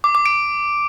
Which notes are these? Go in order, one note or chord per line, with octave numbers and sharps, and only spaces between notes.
D6
D6
D7